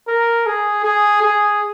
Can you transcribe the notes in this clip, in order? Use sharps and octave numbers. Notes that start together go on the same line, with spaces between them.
A#4
G#4
G#4
G#4